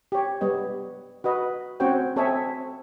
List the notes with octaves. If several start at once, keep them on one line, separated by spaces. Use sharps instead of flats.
G4 C#5
G3 B3 C#5 D#5
F#4 B4 D#5
A3 C4 C#4 F#4 C#5 G5
C4 A4 C#5 D#5 E5 G#5